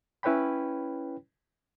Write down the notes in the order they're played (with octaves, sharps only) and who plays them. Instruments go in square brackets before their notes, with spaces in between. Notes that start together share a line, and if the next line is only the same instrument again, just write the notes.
[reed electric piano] C#4 E4 B4 C#5 G5 B5